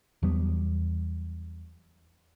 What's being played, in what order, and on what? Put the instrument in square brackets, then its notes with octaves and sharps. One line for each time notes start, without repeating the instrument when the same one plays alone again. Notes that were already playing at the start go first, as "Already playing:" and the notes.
[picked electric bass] E2 F#3 G3 B3